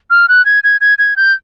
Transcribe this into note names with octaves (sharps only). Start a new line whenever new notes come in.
F6
F#6
G#6
G#6
G#6
G#6
G6